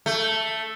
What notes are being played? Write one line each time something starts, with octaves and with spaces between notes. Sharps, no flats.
A3